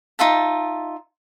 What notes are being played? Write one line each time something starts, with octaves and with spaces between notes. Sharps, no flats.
D#4 F4 E5 A5